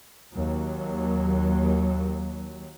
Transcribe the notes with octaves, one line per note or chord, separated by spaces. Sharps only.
D#2 F#3